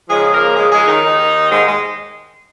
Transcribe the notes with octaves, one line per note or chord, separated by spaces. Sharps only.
D#2 C#3 F3 G#3 G#4
A#3 A#4
G#3 G#4
G#3 G#4
D#3 D#4
D#2 D#3
G#2 G#3
G#3